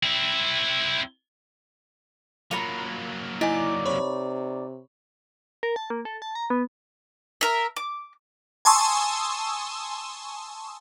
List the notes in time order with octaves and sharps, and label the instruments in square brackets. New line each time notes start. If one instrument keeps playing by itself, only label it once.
[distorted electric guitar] C4 E4
[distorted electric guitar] F#3 A#3 [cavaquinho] F4 A#4 B5 [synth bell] C#7 F7
[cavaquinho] D#4 D5 [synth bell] E4 G#5
[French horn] C3 [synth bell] C#5 B5 C#6
[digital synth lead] A#4
A5
A#3
A4
A5
A#5
B3
[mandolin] A#4 E5
D6
[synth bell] G#5 A5 C6 C#6 D#6 E6